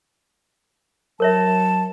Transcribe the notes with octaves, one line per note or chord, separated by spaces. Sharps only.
F#3 A#4 C#5 E5 A5